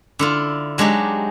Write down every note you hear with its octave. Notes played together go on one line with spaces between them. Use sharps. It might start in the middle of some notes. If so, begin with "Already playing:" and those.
D3 E4 F4
F#3 G#3 D4 D#4 G4